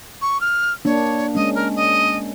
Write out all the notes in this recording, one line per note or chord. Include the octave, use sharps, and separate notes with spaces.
C#6
F6
A#3 D4 C#5
G#3 C#4 D#5
A#4
D#5